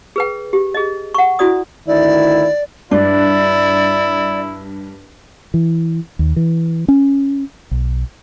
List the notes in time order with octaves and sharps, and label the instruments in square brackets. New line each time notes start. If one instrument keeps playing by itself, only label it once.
[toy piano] G#4 B4 G5
G4
G#4 D#5
F#5 C#6
E4 F#4 D5 D#6
[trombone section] D2 D#3 E4 [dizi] D5
[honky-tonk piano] G2 [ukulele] D4 [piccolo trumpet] E4 [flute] D5
[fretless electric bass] E3
D#2
E3
C#4
B1